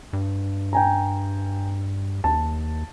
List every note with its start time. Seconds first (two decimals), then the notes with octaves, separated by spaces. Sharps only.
0.13 G2
0.73 G5 G#5 A#5
2.24 D#2 A5